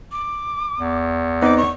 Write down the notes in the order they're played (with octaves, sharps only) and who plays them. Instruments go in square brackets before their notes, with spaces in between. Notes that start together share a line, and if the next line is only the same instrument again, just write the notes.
[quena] D6
[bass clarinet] E2
[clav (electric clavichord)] B3 C4 D#4 [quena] D6
[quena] C#6